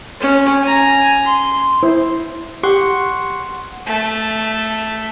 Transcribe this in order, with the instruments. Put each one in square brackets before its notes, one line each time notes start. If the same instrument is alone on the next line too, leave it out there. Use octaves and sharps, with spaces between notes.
[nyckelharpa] C#4
G#5 A#5
C6
[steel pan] E4 C5
[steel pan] G4 [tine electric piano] F#5 C6 C#6
[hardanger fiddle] A3